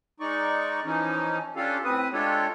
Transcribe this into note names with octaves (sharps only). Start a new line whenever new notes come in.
G#3 D#4 D5 C#6
E3 F3 C#4 D#4
C#4 D4 F4 G4 A4 F5
A2 C4 B4 D#6
G#3 D4 F4 G4 A4 C#5